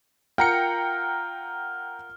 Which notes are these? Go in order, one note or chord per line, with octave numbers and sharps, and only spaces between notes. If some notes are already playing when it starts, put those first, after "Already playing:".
F4 A#4 F#5 G5 A#5 F6 C#7